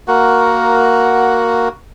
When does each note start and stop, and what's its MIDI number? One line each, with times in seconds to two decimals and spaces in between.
0.08 1.68 58
0.08 1.68 66
0.08 1.68 70
0.08 1.68 78